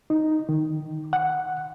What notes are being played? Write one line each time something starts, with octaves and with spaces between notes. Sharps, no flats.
D#4
D#3
F#5